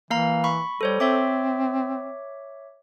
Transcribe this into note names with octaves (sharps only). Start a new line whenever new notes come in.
E3 A#3 F5 A#5
B5 C#6
G3 A4 C5 C#5
C4 C#5 E5 D6